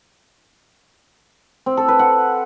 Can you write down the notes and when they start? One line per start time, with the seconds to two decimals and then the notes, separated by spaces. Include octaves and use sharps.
1.66 C4
1.77 A4
1.88 B4
1.99 F#5